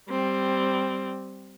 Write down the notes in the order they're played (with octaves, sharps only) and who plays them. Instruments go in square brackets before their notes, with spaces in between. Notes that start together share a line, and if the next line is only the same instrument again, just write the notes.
[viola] G3 C4